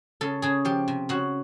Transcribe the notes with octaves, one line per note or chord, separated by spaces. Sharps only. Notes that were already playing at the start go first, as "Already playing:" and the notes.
C#3 A4
C#3 G#4
F3 G4
C3
C#3 F#4